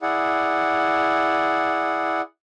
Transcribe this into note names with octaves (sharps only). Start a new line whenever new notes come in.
E4 G#4 D5 F#5